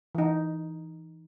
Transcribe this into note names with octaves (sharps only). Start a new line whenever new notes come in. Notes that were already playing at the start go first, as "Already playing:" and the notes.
E3 D#4